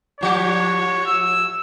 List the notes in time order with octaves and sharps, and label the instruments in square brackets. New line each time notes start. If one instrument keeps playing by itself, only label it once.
[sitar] A2 F3 G4 [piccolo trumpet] C#5
[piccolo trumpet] E6